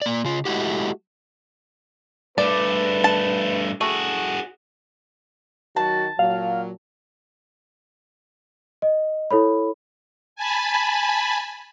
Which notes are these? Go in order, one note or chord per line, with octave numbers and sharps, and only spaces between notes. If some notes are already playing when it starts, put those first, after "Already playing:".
A#3 D5
C#3 F4
G#3 A3 E4 F#4 G4
G2 A3 B4 D5
A5
A3 F#4 G#4
D#3 F#3 F#4 A5
A#2 F#3 F5
D#5
E4 A4 C#5 B5
G#5 A5 B5